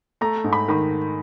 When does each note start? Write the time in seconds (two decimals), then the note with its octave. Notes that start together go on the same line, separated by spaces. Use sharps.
0.21 A3 A#5
0.44 G#2
0.53 B5
0.68 D#3 B5